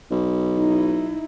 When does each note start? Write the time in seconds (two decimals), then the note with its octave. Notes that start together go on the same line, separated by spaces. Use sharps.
0.11 B1
0.57 D#4 E4